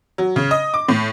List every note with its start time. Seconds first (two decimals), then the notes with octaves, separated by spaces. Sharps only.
0.18 F#3
0.36 C#3
0.51 D#5
0.74 D6
0.89 A2